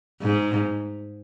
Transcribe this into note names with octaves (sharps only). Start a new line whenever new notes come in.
G#2